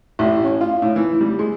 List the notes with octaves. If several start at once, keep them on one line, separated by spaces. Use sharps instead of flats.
A1
C#4
F4
A2
E3
G3
G#3